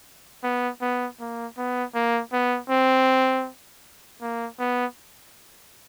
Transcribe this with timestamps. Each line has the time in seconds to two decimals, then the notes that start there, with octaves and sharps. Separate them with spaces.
0.44 B3
0.81 B3
1.20 A#3
1.58 B3
1.95 A#3
2.33 B3
2.70 C4
4.21 A#3
4.59 B3